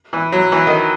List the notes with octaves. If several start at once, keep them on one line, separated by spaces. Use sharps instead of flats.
E3
F#3
E3
D#3